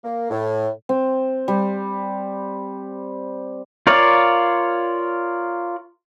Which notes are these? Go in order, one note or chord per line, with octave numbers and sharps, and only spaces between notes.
A#3
A2
C4
G3
F4 A#4 C#5 D5 F5